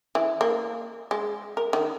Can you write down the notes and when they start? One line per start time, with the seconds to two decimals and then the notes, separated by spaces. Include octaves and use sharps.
0.15 E3
0.41 A#3
1.11 G#3
1.57 A#4
1.73 D#3